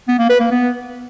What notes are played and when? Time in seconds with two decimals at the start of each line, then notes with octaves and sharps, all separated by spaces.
0.08 B3
0.19 A#3
0.30 B4
0.40 A#3
0.51 B3